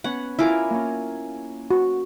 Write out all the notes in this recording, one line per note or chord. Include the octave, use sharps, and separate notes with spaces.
B3 C#4 F#5
E4 F4 A#4 G#5 B5 D6
A#3 C#4
F#4